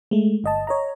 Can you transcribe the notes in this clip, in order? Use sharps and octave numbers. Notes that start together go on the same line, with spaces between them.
G#3 A3
G1 D#5 A5
C#5 D#5 A#5